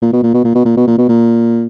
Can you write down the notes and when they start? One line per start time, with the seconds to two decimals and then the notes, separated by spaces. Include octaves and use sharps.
0.02 A#2
0.13 B2
0.23 A#2
0.34 B2
0.44 A#2
0.55 B2
0.65 A#2
0.77 B2
0.87 A#2
0.98 B2
1.09 A#2